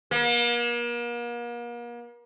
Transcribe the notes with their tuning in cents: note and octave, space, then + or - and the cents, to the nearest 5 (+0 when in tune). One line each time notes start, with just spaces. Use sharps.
A#3 +40